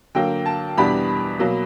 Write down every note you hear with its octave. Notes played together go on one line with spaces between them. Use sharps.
D3 F#3 A#3 G5
A5
E2 B2 G3 B3 D4 B5
B2 F#3 A#3